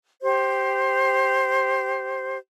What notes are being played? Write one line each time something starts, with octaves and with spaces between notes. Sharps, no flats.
G4 C5